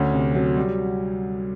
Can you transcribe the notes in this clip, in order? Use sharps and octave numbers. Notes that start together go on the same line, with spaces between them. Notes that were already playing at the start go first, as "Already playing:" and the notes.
Already playing: D2 C#4
C3
F#3
G3